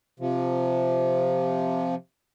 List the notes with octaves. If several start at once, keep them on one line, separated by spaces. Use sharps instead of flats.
C3 F3